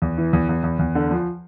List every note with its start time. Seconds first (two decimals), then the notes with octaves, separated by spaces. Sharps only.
0.02 E2
0.18 E3
0.33 E2
0.49 E2
0.63 E2
0.79 E2
0.95 D3
1.11 F3